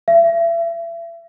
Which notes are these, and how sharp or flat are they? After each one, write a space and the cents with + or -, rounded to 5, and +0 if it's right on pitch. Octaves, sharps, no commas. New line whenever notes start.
E5 +35